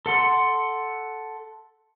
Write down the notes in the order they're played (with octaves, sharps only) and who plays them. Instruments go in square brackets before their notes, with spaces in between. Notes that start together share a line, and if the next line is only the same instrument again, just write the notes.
[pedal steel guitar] A4 F#5 C6